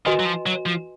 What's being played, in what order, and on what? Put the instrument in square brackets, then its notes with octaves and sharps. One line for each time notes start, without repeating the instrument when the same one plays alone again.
[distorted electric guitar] D#3 [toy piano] F#4 B4 D#5 G#5 C6
[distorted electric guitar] F#3
F3
F#3
F3